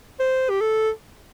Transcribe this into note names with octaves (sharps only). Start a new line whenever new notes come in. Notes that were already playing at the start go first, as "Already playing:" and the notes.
C5
G4
A4